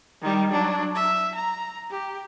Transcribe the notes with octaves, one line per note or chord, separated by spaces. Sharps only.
D#3 G3
F#3 D4
E5
A#5
G4